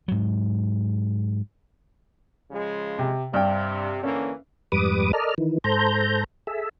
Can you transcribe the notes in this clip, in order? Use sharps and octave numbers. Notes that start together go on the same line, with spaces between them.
G#2 F#3
C#3 F3 G#3
C3
G2 C3 G5
D3 E3 A#3 C#4
F2 G#2 G3 B4 D6 D#6
A4 A#4 D5 D#5 F6
D#3 E3
G#2 A4 C5 A#5 G6
G#4 A4 E5